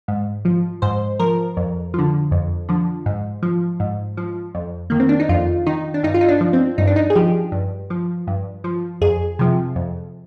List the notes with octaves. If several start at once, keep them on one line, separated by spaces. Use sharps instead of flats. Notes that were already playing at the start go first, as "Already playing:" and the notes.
G#2
F3
G#2 C5
F3 A#4
F2
D3 F3
F2
D3 F3
G#2
F3
G#2
F3
F2
D#3 A#3
C4
D4
D#4
F2 F4
D#3 D#4
D4
G2 D#4
F4
D#4
D4
F3
C4
G2 D#4
D4
D#4
G#4
F3 G4
G2
F3
G2
F3
F2 G#4
C3 F3
F2